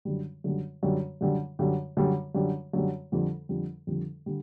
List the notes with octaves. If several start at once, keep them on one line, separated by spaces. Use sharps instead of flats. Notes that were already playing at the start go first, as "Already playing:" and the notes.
F#2 D3 G3
F#2 D3 G3
F#2 D3 G3
F#2 D3 G3
F#2 D3 G3
F#2 D3 G3
F#2 D3 G3
F#2 D3 G3
F2 D3 G3
F2 D3 G3
F2 D3 G3
D3 G3